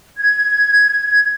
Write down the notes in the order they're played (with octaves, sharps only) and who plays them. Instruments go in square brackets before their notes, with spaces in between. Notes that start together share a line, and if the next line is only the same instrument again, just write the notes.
[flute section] G#6